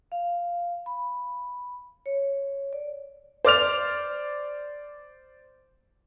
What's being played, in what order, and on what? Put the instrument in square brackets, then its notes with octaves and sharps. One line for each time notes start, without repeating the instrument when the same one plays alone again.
[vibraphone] F5
B5
C#5
D5
[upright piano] C5 D5 F6 F7